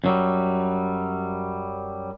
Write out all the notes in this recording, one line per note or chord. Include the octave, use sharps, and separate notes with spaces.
F#2 F#3 G3